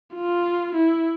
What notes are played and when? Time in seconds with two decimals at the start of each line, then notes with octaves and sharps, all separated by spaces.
0.14 F4
0.75 E4